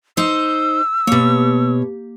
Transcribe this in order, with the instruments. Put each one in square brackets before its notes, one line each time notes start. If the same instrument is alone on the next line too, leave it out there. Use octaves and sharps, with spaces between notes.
[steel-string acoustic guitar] D#4 C5 [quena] E6
[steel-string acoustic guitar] B2 C#5 [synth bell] A#3 G4